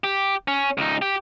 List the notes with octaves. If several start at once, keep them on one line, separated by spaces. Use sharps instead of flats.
G4
C#4
C#2 D#4
G4